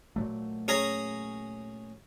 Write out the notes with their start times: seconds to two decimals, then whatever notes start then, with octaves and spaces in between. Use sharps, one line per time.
0.16 A#2 F#3 A3
0.68 C#4 G#4 A#5